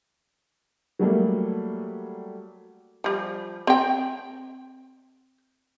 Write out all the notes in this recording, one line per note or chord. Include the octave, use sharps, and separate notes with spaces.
F#3 G3 A3 A#3
F3 G3
C4 G5